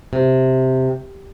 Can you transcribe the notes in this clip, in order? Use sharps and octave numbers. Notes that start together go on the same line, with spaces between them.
C3